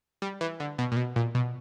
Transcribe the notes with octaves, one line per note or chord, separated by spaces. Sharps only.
G3
E3
D3
B2
A#2
B2
A#2
B2